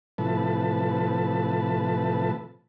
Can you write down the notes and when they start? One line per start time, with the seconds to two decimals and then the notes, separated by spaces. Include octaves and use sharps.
0.18 A2 C3 E3 F3 B4 A5